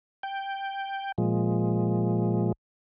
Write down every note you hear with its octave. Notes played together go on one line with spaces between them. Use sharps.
G5
A#2 F3 G#3